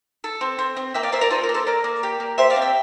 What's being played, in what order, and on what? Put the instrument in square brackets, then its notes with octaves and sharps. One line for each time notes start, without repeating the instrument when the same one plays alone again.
[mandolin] A4
C4
C4
C4
A#3 E5 G5
D5 F5
A#3 C5 E5
A#4 D5
F4 A4 C5
A#4
A#3
A4 C5
A#3 A#4 D5
A#3
G4
A#3
G4 C5 E5
D5 F5
C4
E5 G5